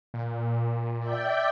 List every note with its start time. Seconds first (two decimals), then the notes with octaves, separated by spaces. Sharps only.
0.14 A#2
0.99 D5 E5 G5